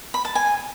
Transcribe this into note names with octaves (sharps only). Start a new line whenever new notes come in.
B5
A5
G#5